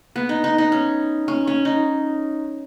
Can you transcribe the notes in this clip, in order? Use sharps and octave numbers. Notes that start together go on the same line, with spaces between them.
B3
D#4
D#4
D#4
C#4
C#4
C#4
D#4